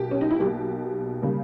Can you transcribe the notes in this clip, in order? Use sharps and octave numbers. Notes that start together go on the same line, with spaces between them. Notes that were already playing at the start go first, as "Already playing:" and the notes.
Already playing: B1 B2 A#3 G4
C#4
D#4
E4
B1 B2 A#3 G4
C#3 G3 A#3